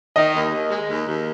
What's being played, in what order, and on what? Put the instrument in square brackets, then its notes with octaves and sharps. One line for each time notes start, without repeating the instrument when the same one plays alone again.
[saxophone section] D#3 [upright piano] D#5
[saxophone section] D#2
D#2
G#3
D#2
D#2